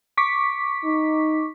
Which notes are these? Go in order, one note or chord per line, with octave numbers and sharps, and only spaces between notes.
C#6 D6 B6
D#4